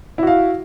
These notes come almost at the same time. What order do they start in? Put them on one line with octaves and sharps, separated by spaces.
E4 F#4 F5